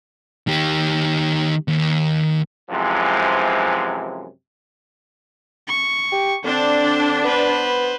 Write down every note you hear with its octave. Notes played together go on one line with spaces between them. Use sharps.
D#3 G4
D#2
F#2 C3 E3 F3 G#3
C#6
G4
D3 C4 D4 C5
B3 B4 C5